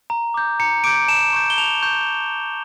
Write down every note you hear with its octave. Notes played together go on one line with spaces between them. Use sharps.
A#5
D6 G6
A#5 C#7
D6 G6 D7
A5 E7
C#6 G6
G7
A5 F7
C#6 G6